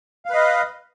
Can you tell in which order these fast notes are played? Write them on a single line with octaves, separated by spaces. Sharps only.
F5 B4 D#5